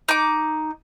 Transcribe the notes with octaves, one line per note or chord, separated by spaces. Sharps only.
D#4 D6